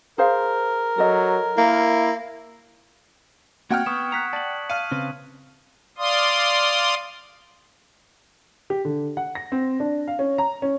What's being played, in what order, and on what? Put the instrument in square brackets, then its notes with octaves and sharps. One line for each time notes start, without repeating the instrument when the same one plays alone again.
[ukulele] G#4 C5 F5 [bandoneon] A#4
[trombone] F#3 [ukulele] A4 D#5
[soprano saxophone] A#3 [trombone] E4
[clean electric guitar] A#3 C4 F#4 [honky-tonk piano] F#5 G5 F6 [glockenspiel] G#6
[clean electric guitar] B3 [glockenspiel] C#6 D#6 E7
[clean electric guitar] A#5 [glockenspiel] F#6 B6 C#7
[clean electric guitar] D5 [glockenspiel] A5 F#7
[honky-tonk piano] F5 [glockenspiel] D#7
[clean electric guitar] C#3 C4 B4
[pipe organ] D5 F5 C6 D#6
[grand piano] G4
D3
F#5
A#6
C4
D4
F5
C#4
A#5
C#4